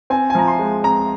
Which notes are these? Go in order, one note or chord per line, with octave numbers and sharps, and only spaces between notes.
C4 G#5
G#5
F3 A#5
C6
G#3
C4 A#5